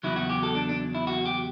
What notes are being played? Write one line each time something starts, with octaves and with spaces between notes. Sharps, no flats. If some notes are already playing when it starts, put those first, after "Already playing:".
E2 C#3 F#3 E4
F#4
G4
A4
D4
D4
E4
F#4
G4